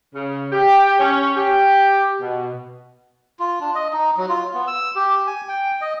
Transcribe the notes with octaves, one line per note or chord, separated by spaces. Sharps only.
C#3
G4
C#4
G4
B2
F4
D4
D#5
D#4
F#3
F4
B3
E6
G4
G#5
G5
D#5